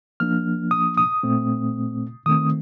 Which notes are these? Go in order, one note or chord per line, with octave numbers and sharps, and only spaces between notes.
F3 A#3 D4 F6
D#6
D#6
A#2 A3 C4
D#3 A3 C4 D#6